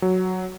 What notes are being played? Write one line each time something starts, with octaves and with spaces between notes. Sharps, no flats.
F#3